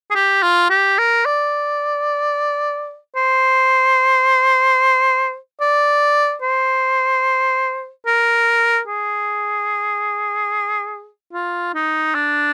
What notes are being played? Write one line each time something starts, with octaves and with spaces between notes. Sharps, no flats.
G#4
G4
F4
G4
A#4
D5
C5
D5
C5
A#4
G#4
F4
D#4
D4